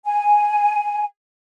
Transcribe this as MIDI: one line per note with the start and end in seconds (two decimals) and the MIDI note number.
0.05 1.03 80